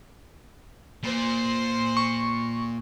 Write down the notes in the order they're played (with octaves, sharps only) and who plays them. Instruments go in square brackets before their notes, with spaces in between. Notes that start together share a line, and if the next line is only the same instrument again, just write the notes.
[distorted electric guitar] A#2 [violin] C5 C6
[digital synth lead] C#6